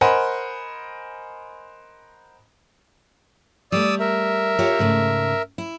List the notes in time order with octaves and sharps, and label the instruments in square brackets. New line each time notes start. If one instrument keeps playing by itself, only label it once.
[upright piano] A#4 C5 D#5 F#5 G#5 B5
[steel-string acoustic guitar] G3 A3 [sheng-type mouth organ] D5 D#6 E6
[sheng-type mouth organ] A#4 E5
[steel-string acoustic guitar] F4 G4 C#5
G#2 C#3 A3
E4